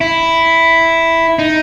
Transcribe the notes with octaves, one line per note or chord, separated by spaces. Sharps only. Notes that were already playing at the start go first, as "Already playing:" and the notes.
E4
D#4